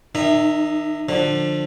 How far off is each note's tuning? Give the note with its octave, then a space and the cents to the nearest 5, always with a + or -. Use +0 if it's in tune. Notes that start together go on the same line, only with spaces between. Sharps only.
D#3 +0 D#4 -40 E5 +0
D3 +20 F3 +20